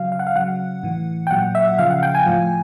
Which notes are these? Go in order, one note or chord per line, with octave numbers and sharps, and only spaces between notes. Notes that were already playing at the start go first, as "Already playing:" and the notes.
Already playing: C#3 F#3 F5
F5
F#5
F5
C#3 F#3 F#5
A2 E3
G5
A#2 F#3 F#5
E5
C#3 F3 F5
F#5
G5
G#5
A2 F3